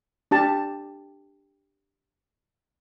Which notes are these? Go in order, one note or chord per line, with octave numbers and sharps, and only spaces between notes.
D4 G4 A5